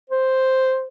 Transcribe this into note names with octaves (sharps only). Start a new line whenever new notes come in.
C5